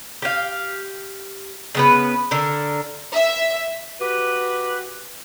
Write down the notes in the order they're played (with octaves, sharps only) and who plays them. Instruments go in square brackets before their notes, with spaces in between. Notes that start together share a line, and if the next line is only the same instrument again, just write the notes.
[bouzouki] G4 F5
C#3 B3 B4
D3 D4 A#4
[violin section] E5
[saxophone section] F#4 G4 B4